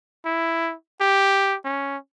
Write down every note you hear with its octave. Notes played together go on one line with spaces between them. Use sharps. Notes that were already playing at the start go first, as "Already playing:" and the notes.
E4
G4
C#4